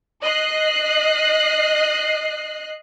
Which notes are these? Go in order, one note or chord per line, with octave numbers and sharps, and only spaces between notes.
D#5 F#6 C7